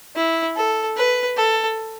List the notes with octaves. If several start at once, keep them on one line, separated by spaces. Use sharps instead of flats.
E4
A4
B4
A4